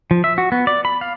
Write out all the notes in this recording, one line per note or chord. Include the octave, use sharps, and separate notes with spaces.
F3
E5
F#4
B3
D5
B5
F5